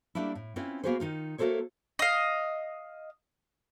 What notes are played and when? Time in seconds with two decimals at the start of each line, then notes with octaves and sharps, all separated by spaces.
0.15 G3 A3 A#3 D4 E4
0.35 A2
0.56 C4 C#4 E4 F4 B4
0.83 A#3 B3 F#4 G#4 B4 C5
1.00 D#3 D#4 F4
1.38 A3 A#3 F#4 A4 C5 C#5
1.99 D#5 F5